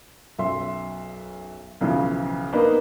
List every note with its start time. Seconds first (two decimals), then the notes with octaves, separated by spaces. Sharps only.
0.39 B1 F#2 E5 C6
1.81 B1 C#3 E3 F3
2.53 A#3 B3 D4 D#4 B4